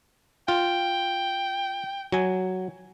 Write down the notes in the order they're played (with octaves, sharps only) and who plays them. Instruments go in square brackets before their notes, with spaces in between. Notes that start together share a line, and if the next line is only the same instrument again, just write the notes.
[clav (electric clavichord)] F4 [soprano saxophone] G5
[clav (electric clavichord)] F#3 G#5